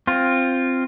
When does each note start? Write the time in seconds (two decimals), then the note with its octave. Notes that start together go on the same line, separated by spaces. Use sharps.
0.07 C4 F4